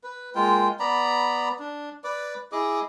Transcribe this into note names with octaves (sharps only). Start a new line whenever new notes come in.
B4
G#3 A#3 F4 G5
B3 D5 A#5 B5
D4
B4 D5 D6
E4 G#4 D#5 D6